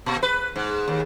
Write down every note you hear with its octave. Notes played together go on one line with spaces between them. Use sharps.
A#2
B4
G#2
D#2